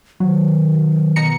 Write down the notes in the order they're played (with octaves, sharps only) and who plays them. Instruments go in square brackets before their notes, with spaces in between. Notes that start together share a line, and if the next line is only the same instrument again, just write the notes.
[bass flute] D#3 [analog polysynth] F#3
[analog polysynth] B2 A#5 C#7